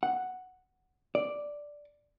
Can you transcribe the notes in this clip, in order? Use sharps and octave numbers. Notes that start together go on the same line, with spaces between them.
F#5
D5